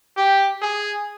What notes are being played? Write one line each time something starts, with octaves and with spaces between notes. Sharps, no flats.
G4
G#4